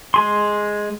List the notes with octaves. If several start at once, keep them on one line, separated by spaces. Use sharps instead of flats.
G#3 G#4 C6